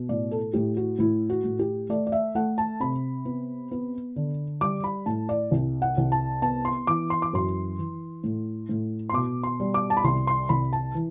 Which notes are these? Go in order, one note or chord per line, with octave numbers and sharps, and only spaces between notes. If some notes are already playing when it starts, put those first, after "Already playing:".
Already playing: B2
A2 D5
A4
A2 G4
F#4
A2 E4
F#4
A2
G4
A3 D5
D5
E5
A3 F#5
A5
C3 B5
B3
B3
D3
G3 D6
B5
A2 A5
D5
C2
F#5
C2
A5
B3 A5
C6
E3 D6
C6
D6
F#2 C6
E3
A2
A2
C6
B2 D6
C6
G3
D6
A5
B5
C2 C6
C6
C2 B5
A5
E3